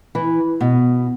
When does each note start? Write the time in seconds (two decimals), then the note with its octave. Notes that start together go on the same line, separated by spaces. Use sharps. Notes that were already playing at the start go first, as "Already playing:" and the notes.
0.15 E3
0.61 B2